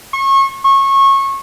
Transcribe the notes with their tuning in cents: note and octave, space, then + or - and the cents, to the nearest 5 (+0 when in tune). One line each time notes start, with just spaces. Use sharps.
C#6 -30
C#6 -25